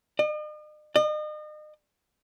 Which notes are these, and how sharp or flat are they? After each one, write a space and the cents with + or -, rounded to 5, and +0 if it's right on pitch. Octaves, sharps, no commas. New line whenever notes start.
D#5 -45
D#5 -40